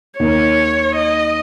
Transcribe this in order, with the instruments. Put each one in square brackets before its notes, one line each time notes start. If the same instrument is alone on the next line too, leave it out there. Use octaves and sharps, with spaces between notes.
[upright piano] D#2 D#3 A#3 [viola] C#5
[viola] D#5